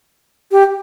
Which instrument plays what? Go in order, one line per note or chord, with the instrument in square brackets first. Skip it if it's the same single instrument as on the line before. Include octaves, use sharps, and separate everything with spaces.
[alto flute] G4